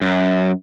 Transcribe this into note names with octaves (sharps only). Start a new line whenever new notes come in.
F#2